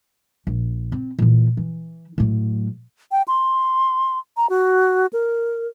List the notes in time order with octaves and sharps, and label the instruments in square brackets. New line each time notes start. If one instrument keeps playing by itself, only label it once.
[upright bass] A#1
C4
A#2 E3
E3
A2 F#3
[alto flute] G5
C6
A#5
F#4
A#4